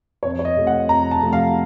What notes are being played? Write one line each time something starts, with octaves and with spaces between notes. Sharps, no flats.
F2 C#5
C#5
D#5
C3 F3 A3
F#5
F2 A#5
A5
C3 F3 A3
F5